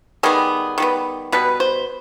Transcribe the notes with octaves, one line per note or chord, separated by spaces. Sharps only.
D#3 G3 B3 G#4
D#3 G3 B3
B2 G3 B3 B4
C5